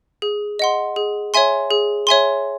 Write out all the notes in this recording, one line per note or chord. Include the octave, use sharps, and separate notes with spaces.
G#4
D#5 F#5 C6
G#4
C#5 E5 G#5 C6
G#4
C#5 E5 G#5 C6